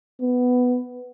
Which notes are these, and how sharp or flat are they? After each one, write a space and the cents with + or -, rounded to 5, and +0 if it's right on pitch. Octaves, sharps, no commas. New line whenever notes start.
B3 +5